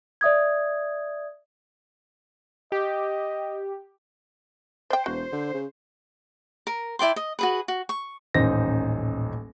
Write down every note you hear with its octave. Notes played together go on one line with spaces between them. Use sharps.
D5 E5 D#6 G#6
G4 D#5
C5 D5 G5
E1 F#4
D3
C#3
A#4
E4 D5 G5 C6
D#5
F#4 G#4 B4
F#4
C#6
D#1 A1 D#4 C5 A#6